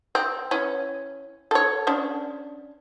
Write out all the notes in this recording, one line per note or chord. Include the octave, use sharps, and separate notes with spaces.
C4
E3 C#4
A4 C#5
C#4 D4